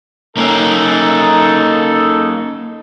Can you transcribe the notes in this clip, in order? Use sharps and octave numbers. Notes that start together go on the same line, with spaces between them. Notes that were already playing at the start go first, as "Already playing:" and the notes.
A#3 C#4 D#4 A4